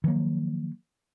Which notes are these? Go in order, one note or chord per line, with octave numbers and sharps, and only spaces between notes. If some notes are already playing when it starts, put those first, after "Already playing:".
D#3 F3 F#3 A#3